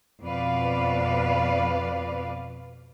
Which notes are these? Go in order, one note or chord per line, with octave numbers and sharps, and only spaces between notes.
F2 B2 B4 D5 F5